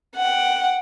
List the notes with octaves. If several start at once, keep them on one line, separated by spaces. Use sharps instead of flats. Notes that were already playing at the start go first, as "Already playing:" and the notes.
F#5 G5